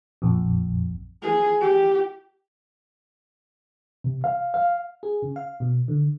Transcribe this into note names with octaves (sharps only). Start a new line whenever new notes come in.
A#1 F2
G#4
G4
C3
F5
F5
G#4
C#3
F5
B2
D3